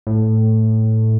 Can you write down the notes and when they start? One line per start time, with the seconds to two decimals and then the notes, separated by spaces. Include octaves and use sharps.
0.07 A2